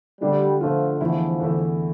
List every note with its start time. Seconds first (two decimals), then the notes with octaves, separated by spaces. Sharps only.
0.21 D3 G3 A3 D4 F4
0.61 D3 F3 A3 D4 F4
1.01 E2 D3 F3 A3 E4
1.40 E2 D3 A3 E4